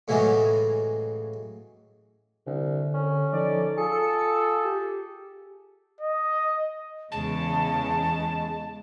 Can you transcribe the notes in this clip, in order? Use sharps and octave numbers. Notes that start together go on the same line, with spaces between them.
A2 C#3 E3 F#3 G#3 A3
C2 D3
C#4
F3 D#4 A4 D5
F4 G#4 A4 C#7
G4
D#5
E2 C#3 G#3 A5